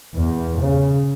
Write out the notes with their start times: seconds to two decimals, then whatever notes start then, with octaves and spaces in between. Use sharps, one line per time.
0.15 E2
0.60 C#3